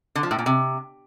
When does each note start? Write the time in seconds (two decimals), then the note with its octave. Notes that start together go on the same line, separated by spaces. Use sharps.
0.15 D3
0.23 F3
0.31 A2
0.38 A#2
0.46 C3